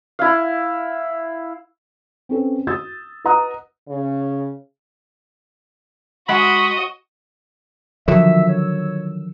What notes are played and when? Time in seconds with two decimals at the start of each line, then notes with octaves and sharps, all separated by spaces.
0.19 E4 F5
2.29 C4 C#4 A4 B4
2.67 D#6 E6 G6 A6
3.25 B4 D#5 F#5 A#5 D#6 F#6
3.89 C#3
6.29 G#3 F#4 D#5 F#5 B5
8.08 D3 D#3 F3 F#3 E5 E6
8.49 C#5